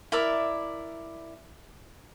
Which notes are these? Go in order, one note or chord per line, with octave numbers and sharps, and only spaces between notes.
E4 A#4 D5 E5